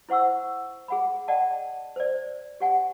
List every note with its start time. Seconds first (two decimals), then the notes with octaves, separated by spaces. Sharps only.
0.09 E4 C5 F#5 C#6 E6
0.88 G#4 F#5 B5
1.28 D5 D#5 F#5 G5 A5
1.96 C5 D5
2.60 G4 F#5 G#5